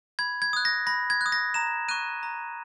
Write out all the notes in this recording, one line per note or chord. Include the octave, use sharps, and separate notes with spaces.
B5 G#6
G#6
D#6 F#6
A#6
B5 A#6
G#6
D#6 F#6
A#6
A#5 E7
C#6 F#6 D#7
A#5